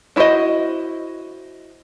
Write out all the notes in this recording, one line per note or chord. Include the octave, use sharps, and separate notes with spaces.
D4 E4 F#4 C5 D#5